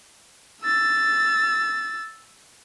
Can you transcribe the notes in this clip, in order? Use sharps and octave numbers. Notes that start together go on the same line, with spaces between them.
E6 A6